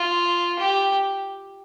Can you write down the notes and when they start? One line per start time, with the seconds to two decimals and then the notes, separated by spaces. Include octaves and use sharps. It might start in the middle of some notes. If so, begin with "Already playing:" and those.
Already playing: F4
0.59 G4